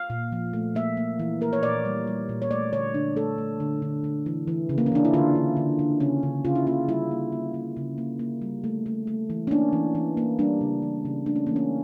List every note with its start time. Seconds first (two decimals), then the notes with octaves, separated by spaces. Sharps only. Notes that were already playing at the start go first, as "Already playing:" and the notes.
Already playing: F5
0.10 A#2
0.32 F3
0.53 A3
0.75 A#3 E5
0.97 A#3
1.19 E3
1.41 A#3 A#4
1.53 C#5
1.63 A#2 D5
1.85 G3
2.07 G3
2.29 A#2
2.42 C#5
2.51 A3 D5
2.72 D3 C#5
2.94 D3 D4
3.16 A3 A4
3.38 A3
3.60 D3
3.82 D3
4.04 D3
4.26 E3
4.48 E3
4.69 C#3
4.78 A#3
4.86 C#4
4.92 E3 D4
5.05 E4
5.13 D3 F4
5.35 D3
5.57 D3
5.79 D3
6.00 C#3 C#4
6.23 C#3
6.45 C#3 F4
6.55 E4
6.67 A#3 F4
6.88 G3 E4
7.11 A#3
7.32 A#3
7.54 A#3
7.77 C#3
7.98 A#3
8.19 A#3
8.42 G3
8.64 A3
8.86 A3
9.07 A3
9.30 E3
9.47 C#4
9.51 A#3 D4
9.73 E3
9.95 E3
10.17 A#3
10.39 G3 D4
10.61 C#3
10.82 E3
11.05 C#3
11.26 A3 D4
11.36 C#4
11.47 E3 A#3
11.56 C#4